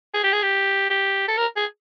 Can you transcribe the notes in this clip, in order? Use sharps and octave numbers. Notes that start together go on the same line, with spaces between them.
G#4
G4
G#4
G4
G4
A4
A#4
G#4